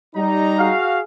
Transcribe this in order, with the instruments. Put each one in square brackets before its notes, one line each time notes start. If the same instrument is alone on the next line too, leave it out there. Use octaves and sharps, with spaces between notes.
[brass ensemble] G3 D#4 A#5
[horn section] F#4 G#4 F5